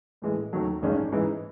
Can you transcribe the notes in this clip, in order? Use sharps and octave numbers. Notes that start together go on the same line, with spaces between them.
A2 E3 G#3
D#2 D#3 F#3 A3
A1 G2 D#3 G#3 C#4
G#2 E3 G#3